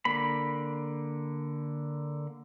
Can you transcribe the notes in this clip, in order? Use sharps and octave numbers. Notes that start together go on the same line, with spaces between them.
D3 A#3 B5